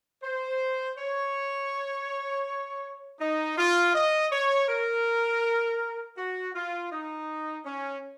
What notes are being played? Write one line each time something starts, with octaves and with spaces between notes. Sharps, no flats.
C5
C#5
D#4
F4
D#5
C#5
A#4
F#4
F4
D#4
C#4